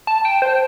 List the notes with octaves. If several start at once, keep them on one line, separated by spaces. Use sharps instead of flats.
A5
G5
C5